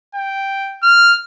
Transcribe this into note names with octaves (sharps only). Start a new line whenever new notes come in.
G5
F6